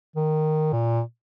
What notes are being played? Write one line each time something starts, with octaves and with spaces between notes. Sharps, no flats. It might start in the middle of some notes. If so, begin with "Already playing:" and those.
D#3
A#2